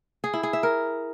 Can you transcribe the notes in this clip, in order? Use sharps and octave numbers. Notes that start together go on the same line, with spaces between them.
G#4
E4
G#4
E5
A#4